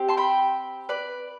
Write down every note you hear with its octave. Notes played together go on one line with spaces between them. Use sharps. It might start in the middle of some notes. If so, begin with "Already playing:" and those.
Already playing: C4 G4
A5 C6
G5 B5
B4 D5